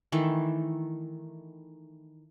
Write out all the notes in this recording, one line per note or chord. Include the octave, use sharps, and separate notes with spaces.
D#3 E3 A3